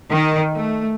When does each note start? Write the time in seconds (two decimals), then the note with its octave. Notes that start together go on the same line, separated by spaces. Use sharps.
0.11 D#3
0.53 A3